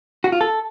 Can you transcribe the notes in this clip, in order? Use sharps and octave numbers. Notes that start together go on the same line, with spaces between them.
F#4
F4
A4